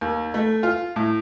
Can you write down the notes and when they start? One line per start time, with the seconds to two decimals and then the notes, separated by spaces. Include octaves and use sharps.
0.01 D#2
0.34 A3
0.63 F4
0.96 A2